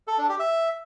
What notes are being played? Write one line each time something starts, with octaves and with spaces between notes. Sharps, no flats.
A4
D4
G4
E5